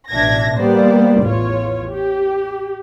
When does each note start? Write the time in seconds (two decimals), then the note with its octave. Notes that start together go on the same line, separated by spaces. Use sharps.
0.11 A1 B2 D4 E5 G#6 A#6
0.57 G3 A#3 B3 C5 D5
1.22 A1 E2 F4 C#5
1.88 G4